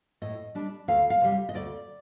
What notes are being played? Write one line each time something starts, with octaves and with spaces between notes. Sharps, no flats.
A2 D#5
G3 D4
D2 F5
F5
C3 G3
D#5
D2 D5